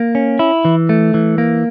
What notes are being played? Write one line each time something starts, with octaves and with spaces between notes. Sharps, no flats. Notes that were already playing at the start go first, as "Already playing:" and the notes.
Already playing: A#3
C#4
E4
E3
A3
E3
A#3